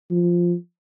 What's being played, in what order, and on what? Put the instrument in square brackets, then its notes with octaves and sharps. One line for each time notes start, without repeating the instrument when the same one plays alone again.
[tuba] F3